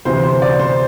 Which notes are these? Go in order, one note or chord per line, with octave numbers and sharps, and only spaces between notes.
D2 C3 E3 C5
C5
D5
C5